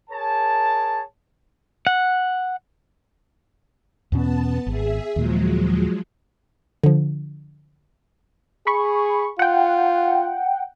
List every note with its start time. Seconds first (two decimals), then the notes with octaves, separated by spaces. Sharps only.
0.10 G#4 A#4 C#5 A5
1.87 F#5
4.12 E2 B2 B3 C#4 A5
4.67 G#1 G#4 E5
5.16 D#2 A#2 F3 F#3 G#3
6.84 D3 F3
8.67 G#4 B5 C#6
9.39 F4 F#5 G5